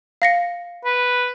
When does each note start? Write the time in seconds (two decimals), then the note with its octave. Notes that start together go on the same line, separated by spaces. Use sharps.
0.22 F5 A#6 C#7
0.85 B4